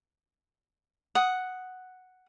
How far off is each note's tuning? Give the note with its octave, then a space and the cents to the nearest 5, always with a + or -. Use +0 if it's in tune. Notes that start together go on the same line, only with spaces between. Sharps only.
F#5 +0 D#6 +5